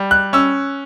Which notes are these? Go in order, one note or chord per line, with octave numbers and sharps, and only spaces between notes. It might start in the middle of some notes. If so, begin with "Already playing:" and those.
Already playing: G3
F#6
C#4 E6